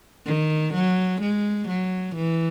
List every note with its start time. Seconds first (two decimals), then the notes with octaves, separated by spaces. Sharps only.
0.26 D#3
0.74 F#3
1.21 G#3
1.68 F#3
2.15 E3